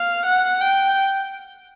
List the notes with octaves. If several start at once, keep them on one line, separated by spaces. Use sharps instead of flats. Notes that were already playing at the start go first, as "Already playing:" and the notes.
Already playing: F5
F#5
G5